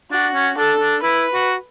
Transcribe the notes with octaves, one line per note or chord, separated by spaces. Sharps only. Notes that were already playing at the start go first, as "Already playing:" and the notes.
D4 F#4
C#4
D4 A4
D4
E4 B4
F#4